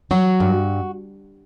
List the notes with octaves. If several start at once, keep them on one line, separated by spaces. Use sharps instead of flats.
F#3 F#4
G2